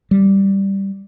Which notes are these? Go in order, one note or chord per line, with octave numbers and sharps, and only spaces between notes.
G3